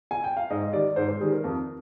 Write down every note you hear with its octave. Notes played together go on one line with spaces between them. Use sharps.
G#5
G5
F5
G#2 D#5
D#3 G3 D5
G#2 C5
C5
D#3 G3 G#4
A#4
F2